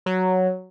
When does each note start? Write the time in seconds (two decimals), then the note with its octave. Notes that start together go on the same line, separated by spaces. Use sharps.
0.06 F#3